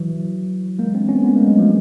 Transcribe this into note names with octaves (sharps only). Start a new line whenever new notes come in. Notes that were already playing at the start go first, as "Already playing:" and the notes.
Already playing: E3 F#3
G#3 A#3
C4 D4
B3 C#4
A3 B3
G#3 A#3
F#3 G#3
F3 G3